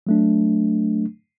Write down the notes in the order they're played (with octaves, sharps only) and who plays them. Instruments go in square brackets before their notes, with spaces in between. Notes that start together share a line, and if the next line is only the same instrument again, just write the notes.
[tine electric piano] F#3 A3 D4